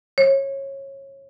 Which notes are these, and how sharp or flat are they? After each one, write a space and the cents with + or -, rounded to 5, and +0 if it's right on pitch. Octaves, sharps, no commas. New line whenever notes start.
C#5 -20